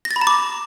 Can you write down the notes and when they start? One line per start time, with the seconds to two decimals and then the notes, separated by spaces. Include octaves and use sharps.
0.05 A#6
0.11 A6
0.16 B5
0.21 A#5
0.27 D6